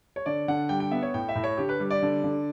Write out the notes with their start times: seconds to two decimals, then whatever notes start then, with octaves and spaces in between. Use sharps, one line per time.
0.16 C#5
0.26 D3 D5
0.48 D3 F#5
0.69 G3 G5
0.80 G5
0.91 B3 E5
1.02 C#5
1.14 A2 G5
1.29 E5
1.35 A2
1.44 C#5
1.57 D3 G4
1.69 B4
1.80 G3
1.90 D5
2.02 D3
2.24 D3